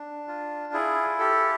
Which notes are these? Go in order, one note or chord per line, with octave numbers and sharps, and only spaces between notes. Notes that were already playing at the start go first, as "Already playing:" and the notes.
Already playing: D4
F4
E4 G#4
G4 A4